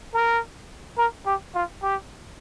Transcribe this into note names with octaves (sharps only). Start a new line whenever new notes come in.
A#4
A#4
G4
F4
G4